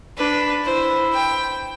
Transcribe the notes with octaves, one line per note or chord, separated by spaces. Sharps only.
D4 B4
E4 C5
G5